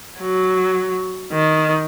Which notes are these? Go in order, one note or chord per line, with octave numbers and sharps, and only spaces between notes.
F#3
D#3